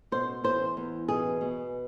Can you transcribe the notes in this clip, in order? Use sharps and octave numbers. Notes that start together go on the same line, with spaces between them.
B2 C5
E2 C5
E2
B2 G#4
B2